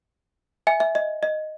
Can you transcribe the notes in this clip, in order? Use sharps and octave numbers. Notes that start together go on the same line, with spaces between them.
E5 G#5
E5
D#5
D#5